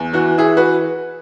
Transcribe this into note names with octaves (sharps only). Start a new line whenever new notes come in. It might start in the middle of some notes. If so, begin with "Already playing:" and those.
Already playing: E2
E3 F#4
E3 E4 G#4
F#4 B4